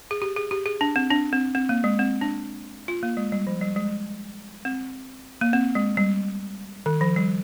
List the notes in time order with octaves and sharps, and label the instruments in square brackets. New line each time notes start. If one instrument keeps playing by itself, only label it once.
[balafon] G#4
G4
G#4
G4
G#4
D4
C4
D4
C4
C4
A#3
G#3
C4
D4
F4
A#3
G#3
G3
F3
G3
G#3
C4
A#3
C4
G#3
G3
D#3
F3
G3